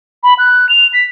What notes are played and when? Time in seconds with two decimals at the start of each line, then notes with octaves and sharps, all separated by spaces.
0.23 B5
0.39 F#6
0.69 F7
0.93 B6